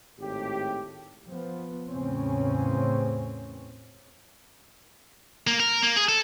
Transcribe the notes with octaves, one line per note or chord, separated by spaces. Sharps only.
G#1 A2 G4
F3 B3
E2 A2 C#3 C4 C#4
A#3
A#4
A#3
G#4
A4